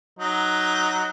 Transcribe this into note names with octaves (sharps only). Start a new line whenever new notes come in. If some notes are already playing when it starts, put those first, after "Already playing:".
F#3 D#4